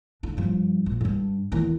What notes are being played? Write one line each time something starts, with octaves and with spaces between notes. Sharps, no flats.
D3 D4
G2 F3
A#1
G2 D4
E2 D#3